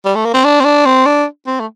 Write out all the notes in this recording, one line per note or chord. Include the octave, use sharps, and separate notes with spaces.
G3
A3
A#3
C4
D4
C4
D4
C4
D4
C4
A3